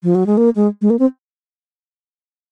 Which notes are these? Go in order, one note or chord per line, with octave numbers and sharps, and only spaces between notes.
F3
F#3
G#3
A#3
G#3
G#3
A#3
C4